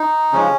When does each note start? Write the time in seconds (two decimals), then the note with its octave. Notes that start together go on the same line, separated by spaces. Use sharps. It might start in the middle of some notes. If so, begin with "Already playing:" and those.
Already playing: D#4
0.33 C#3 F3 G#3 C#4